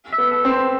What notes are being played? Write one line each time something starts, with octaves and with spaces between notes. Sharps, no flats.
E5
B3
A4
C4
C5